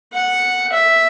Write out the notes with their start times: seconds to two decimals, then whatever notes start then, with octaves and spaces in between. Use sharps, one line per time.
0.13 F#5
0.72 E5